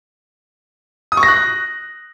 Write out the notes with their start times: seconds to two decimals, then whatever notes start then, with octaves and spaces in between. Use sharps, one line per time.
1.12 D#6
1.17 C#6
1.23 A#6
1.28 F#6